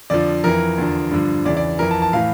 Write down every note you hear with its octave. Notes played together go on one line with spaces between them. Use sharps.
F2 D3 F3 D5
F2 E3 A#4
E2 D3 F3
G2 D3 F3
E2 C#3 E3 D5
D5
F2 E3 A#4
A5
A5
A2 E3 F5